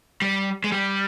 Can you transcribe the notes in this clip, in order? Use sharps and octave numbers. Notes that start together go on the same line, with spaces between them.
G3
G#3
G3